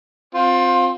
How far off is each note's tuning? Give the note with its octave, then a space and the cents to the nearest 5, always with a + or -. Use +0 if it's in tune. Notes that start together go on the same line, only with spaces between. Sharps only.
C4 +0 F4 +20